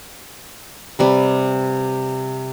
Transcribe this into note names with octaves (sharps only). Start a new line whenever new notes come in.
C3 G3 B4